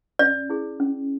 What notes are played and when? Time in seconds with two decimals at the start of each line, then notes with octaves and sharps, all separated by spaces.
0.19 C#4 D5
0.50 E4 G#4
0.80 C#4